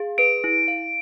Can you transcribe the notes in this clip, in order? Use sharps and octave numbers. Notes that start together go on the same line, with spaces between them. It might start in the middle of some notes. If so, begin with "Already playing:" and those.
Already playing: G#4 F5
B4 D7
E4
F5